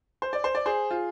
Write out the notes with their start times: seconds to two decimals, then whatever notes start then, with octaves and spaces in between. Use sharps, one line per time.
0.22 C5
0.33 D5
0.44 C5
0.55 D5
0.66 G#4 C5
0.91 F4 G#4